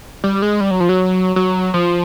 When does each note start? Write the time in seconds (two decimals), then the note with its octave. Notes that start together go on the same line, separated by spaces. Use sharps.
0.24 G3
0.42 G#3
0.61 G3
0.71 F#3
0.80 F3
0.89 F#3
1.36 F#3
1.74 F3